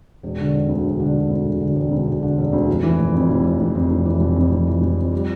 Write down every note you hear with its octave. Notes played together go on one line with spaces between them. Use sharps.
E1
D3
E1
D2
E1
D3
E1
D2
E1
D3
E1
D2
E1
D3
E1
D2
F1
E3
F1
F2
F1
E3
F1
F2
F1
E3
F1
F2
F1
E3
F1
F2
G3